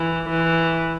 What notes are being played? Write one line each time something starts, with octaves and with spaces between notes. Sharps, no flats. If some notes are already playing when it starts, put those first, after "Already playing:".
Already playing: E3
E3